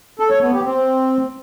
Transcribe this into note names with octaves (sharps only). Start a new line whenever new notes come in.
A4
C#5
B3
G4
C4